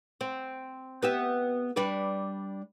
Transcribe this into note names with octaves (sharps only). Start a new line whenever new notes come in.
C4
B3 G4 E5
G3 D4 B4